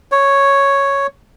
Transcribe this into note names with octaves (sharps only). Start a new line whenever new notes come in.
C#5